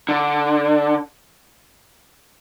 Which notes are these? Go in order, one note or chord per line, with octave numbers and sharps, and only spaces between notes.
D3